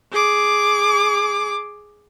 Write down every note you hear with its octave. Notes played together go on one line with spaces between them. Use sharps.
G#4 D6